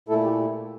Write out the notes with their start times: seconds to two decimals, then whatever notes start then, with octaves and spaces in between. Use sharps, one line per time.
0.08 A#2 A3 E4 A4
0.24 G4